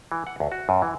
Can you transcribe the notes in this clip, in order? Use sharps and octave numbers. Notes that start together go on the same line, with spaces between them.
E3
F#5
D2
F#4
F#2
E3